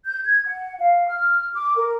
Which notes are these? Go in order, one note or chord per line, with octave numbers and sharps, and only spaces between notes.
G6
G#6
F#5
F5
F6
D6
A#4